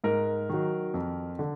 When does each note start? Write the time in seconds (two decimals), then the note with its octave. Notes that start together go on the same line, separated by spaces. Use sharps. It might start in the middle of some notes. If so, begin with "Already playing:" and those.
0.04 G#2 A#4
0.49 D#3 F#3
0.94 F2
1.39 D3